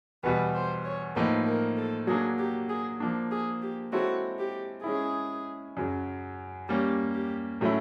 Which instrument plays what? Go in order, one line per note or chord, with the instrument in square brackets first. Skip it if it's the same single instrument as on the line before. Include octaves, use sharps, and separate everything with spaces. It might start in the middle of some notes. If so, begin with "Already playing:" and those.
[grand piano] E2 B2 G3 [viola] B4
[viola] C5
C#5
[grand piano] A2 F3 A#3 D#4 [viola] B4
[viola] A#4
A4
[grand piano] F#3 A#3 D4 [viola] G#4
[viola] G4
G#4
[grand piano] F3 A#3 D4
[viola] G#4
G4
[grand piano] G#3 C4 E4 A4 C#5 [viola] F#4
[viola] G4
[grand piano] G#3 C#4 E4 [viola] G#4
[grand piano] F#2 C#3 F#3
[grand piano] G3 A#3 C#4 [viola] G4
[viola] G4
[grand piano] A2 F#3 A3 C#4 E4